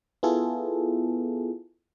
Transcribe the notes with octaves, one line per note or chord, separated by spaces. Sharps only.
B3 E4 F4 G#4 A4